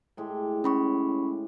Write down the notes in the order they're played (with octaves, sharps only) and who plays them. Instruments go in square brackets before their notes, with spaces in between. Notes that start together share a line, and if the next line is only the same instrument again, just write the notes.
[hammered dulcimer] A2 G#3 G4
[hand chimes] C#4 B5 C#6